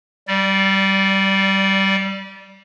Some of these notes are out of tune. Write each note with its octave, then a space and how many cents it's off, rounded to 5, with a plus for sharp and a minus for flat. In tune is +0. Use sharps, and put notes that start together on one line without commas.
G3 -20 D5 +0